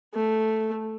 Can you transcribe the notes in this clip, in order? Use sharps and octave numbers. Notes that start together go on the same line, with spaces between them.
A3